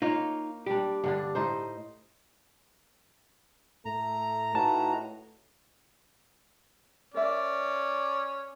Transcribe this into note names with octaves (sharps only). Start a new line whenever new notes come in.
A#3 D#4 F4 C#5
G3 D4 G4
G2 D3 D4
A2 D#4 C5
A2 A3 A#5
A2 D#4 F#4 B4 A5
C#4 A#4 D5 E5